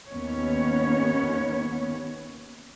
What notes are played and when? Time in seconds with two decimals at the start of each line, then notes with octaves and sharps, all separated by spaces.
0.12 D#2 B3 C#4 C#5